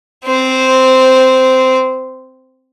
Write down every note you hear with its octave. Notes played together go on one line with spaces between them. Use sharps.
C4 C5